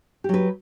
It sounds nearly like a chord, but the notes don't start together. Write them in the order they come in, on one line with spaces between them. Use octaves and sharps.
G4 F#3 B4